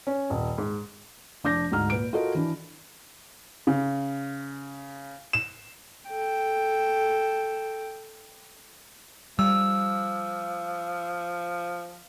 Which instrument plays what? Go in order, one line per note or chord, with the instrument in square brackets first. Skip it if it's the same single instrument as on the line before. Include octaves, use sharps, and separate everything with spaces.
[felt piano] C#4
D#1
G#2
F1 D4 D6 G6 A#6
D2 G#2 A#5 F6
A#2 B4 D7
F4 F#4 A4 A#4 D#5
E3 D4
[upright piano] C#3
E7
[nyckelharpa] A4 G5
[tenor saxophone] F3 [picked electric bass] G3 [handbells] E6